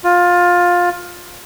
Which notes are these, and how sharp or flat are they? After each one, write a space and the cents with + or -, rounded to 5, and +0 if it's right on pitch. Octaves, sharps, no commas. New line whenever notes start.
F4 +15